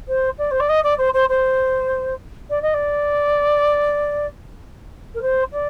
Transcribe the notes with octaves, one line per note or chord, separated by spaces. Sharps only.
C5
D5
C5
D5
D#5
D5
C5
C5
C5
D5
D#5
D5
A#4
C5
D5